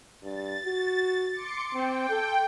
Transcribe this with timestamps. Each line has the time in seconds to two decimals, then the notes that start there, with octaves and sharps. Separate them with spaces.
0.23 G2 A6
0.66 F#4
1.32 C6 D6 C#7
1.74 C4 G5
2.10 A4